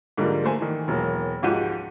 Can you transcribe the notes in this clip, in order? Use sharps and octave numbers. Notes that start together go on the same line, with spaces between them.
G#2 D3 F3 G3 A#3
A3 A#3 C5 G#5
D#3 E3
E1 F#3 A#3
C#2 G#2 F3 F#4 G4 D#7